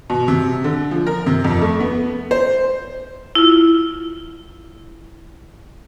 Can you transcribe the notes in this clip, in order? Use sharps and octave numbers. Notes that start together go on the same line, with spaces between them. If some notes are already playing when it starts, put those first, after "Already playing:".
B2
C3
D3
F3
A#4
C3
F2
A3
B3
C5
E4 F4